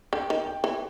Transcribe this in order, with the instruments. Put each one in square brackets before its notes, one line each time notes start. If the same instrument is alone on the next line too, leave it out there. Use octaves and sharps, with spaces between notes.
[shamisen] D3 [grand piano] G5
[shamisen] D#3
[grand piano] G5
[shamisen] E3